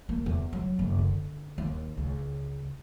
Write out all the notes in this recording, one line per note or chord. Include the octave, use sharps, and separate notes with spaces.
A#3
E2
F#3
F#1
D3
D#2
C#2